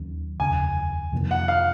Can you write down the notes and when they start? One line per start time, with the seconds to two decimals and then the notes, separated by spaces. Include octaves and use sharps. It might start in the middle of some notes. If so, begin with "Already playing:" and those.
Already playing: D#2 D#3 F#3 C#4
0.40 F1 D#2 C#3 G#5
1.12 F2 C3 D#3 A#3
1.31 F#5
1.48 F5